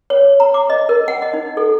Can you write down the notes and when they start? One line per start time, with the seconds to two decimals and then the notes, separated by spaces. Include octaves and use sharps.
0.10 C#5
0.40 A#5
0.54 D6
0.70 D#5
0.89 A#4
1.08 F#5
1.22 D#5
1.33 D#4
1.57 A4